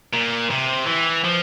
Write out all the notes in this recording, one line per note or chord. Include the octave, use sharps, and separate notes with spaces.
A#2
C3
E3
F3